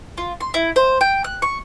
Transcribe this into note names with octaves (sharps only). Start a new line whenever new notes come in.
F4
C6
E4
C5
G5
F#6
C#6